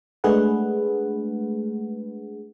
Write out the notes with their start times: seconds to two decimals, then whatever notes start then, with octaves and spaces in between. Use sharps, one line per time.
0.24 G#3 A3 D4 G#4 B4 F#5